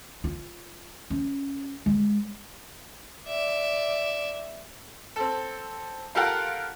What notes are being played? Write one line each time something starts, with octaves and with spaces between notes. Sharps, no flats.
F4
C#4
G#3
D5 E5
C4 A4
F4 G4 A4 A#4 F5 F#5